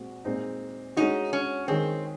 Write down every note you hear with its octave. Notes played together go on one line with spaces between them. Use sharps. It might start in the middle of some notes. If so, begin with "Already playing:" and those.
Already playing: A#2 G#3 C4 F#4
A#2 G#3 C4 D#4
G#3 C#4 D#4 F#4
C#4
D#3 G#3 C4 C#4 G#4